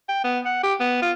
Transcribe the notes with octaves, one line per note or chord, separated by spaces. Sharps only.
G5
B3
F#5
G4
B3
F4